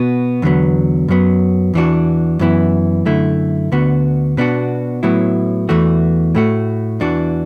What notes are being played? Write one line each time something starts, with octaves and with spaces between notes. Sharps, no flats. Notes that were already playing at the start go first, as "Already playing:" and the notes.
Already playing: B2 B3 F#4
E2 D3 F#3 B3
F#2 F#3 B3
E2 E3 D4 F#4
F#2 E3 B3 E4
F#2 D3 A3 E4
D2 D3 B3 F#4
B2 B3 D4 F#4
A2 F#3 B3 E4
E2 E3 A3 F#4
A2 A3 F#4
E2 E3 D4 F#4